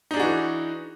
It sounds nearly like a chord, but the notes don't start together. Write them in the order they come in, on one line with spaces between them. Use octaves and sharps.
D#4 D4 G#4 F#4 E3